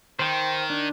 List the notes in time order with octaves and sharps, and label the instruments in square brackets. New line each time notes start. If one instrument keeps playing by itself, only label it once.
[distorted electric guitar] D#3 [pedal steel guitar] C5 G5
[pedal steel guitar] D4